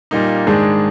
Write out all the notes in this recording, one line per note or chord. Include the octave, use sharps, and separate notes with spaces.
A#2 G3 A#3 D#4
G#2 D#3 G#3 D4 G#4